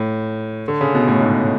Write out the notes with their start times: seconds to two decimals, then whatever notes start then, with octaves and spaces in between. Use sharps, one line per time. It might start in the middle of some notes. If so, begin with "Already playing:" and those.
Already playing: A2
0.68 D3
0.81 C#3
0.95 B2
1.08 A2
1.21 G#2